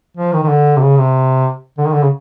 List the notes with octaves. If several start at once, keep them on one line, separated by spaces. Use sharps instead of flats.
F3
D#3
D#3
D3
C3
C#3
C3
D3
D#3
D3
C#3